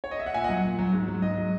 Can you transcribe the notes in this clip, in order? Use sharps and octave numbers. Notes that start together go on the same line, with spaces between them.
C#5
D#5
E5
F#5
A#2 E5 G#5
D#5 F#5
F#3
A#2
F#3
G#2
F#3
G#2 D#5
F#3